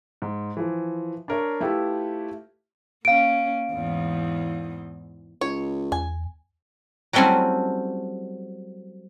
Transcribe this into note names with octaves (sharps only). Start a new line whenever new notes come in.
G#2
E3 F3
D4 A#4 C#5
A3 E4 F4 G4 A4 B4
A#3 C#4 F5 D7
E2 G#2 E3
C#2 C#5
E2 G#5
F#3 G3 A3 C4 C#4 E4